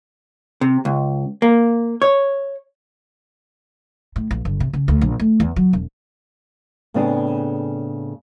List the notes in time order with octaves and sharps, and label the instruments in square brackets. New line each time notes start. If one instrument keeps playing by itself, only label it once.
[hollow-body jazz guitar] C3
C#2
A#3
C#5
[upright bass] A2
A#1
G1
C3
C#3
D2
A#1
A3
E2
F#3
E1
[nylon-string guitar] A2 C#3 B3 C4 D4 G#4